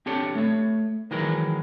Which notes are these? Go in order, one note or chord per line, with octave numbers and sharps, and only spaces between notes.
C4 D4 G4 A4 C#5
A3 C#5
D#3 E3 F#3 G#3 A#4